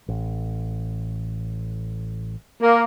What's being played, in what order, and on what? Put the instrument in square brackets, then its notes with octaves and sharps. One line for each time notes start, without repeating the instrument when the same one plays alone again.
[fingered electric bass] A1
[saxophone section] A#3